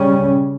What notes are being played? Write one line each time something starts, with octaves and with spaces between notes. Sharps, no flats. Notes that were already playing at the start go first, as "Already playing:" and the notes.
Already playing: C#3 G3 C#4